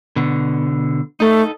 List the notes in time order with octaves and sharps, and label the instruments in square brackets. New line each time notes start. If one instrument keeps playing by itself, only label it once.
[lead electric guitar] B2 D3
[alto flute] A3 [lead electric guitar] D#4 A4